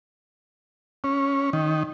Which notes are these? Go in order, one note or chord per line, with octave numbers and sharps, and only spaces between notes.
C#4
D#3